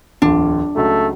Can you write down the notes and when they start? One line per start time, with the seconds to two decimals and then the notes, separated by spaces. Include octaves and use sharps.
0.22 D1 E2 D4 F4
0.76 C#2 F#3 A3